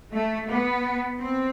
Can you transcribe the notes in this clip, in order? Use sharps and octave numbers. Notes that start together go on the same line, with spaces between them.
A3
B3
C4